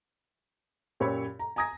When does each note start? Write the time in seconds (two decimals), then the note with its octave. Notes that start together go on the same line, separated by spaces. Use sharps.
1.00 F#2 A#2 G4 C#5 B5 E6
1.39 A#5
1.56 G#5 A#5 D#6 G#6 A#6